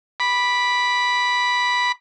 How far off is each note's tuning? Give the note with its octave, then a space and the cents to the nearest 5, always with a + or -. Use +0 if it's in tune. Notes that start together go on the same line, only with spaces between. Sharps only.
B5 -5 D6 +5